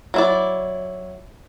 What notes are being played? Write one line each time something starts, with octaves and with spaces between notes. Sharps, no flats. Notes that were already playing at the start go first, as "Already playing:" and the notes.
F#3 E4 D5